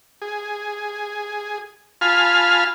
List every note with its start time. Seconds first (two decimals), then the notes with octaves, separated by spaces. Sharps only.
0.22 G#4
2.01 F4 F5 G#5 A5 B5 F6